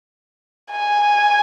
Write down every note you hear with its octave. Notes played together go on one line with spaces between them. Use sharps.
G#5